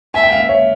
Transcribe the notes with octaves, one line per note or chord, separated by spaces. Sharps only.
E5 G#5
G5
F5
E5
C#5